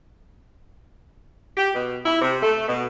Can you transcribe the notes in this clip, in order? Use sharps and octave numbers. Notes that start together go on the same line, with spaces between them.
G4
B2
E4
C3
A3
B2